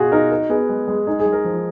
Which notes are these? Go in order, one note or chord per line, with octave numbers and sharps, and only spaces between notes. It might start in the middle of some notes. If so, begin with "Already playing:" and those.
Already playing: B2 F4 F#4 G#4
D#4 A#4
F#4 A#4
B3 G#4
G#3
G#3
D#4 G#4
G#4
G#3
A#4
F3